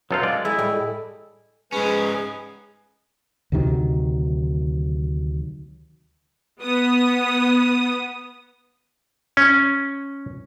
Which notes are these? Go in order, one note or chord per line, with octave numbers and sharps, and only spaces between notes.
F#2 F#3 D#4 F4 A4 B4 F5
G#3 D5 F5
G#3 E4 G#5
A2 G3
G#2 G#3 C#4 G#4 B4 G#5
D2 C3 D#3 F#3
B3 D#6
C#4